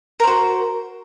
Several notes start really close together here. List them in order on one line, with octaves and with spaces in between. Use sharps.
A#4 C5 F#4